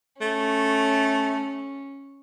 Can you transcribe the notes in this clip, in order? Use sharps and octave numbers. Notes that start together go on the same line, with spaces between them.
A3 C#4